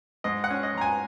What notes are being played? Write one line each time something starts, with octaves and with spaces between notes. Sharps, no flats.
G#2 D#5
F#5
C#4
D#5
G#2 A#5
G#5